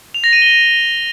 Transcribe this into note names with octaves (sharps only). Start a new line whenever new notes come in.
F7
A#6
D#7
G7
A#6